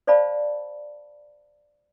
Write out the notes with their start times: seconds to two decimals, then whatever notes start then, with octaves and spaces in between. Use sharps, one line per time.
0.07 C5 D5 F5 A5 B5